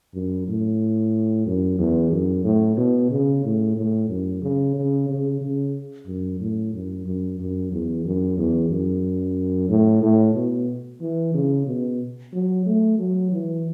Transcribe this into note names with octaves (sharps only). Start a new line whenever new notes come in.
F#2
A2
F#2
E2
F#2
A2
B2
C#3
A2
A2
F#2
C#3
C#3
C#3
C#3
F#2
A2
F#2
F#2
F#2
E2
F#2
E2
F#2
A2
A2
B2
E3
C#3
B2
F#3
A3
F#3
E3